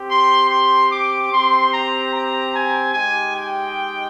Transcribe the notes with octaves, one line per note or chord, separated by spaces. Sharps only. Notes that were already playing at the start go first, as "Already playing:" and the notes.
Already playing: C4 G4
C6
C6
D6
C4 G4 C6
A#5
A#5
G#5
G#3 D#4 G4 G#5
G5